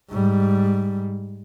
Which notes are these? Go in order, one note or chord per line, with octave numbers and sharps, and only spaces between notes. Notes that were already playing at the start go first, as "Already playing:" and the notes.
G#2 G3